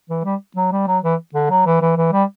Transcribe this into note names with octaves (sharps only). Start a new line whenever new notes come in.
E3
G3
F#3
G3
F#3
E3
D3
F#3
E3
E3
E3
G3